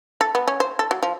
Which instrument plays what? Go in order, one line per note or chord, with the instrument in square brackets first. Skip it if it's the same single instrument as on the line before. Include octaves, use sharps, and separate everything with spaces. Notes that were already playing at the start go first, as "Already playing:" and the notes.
[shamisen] A4
B3
C#4
C5
A4
F#3
F3